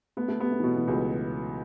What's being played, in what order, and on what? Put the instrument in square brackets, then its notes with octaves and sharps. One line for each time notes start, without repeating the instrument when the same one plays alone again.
[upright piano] A3 [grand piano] B3
[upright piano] A3
[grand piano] B3 [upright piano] G4
[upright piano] A3
E3
[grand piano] B2 [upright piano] F#3
[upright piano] E3
[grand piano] C#2 [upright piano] F#3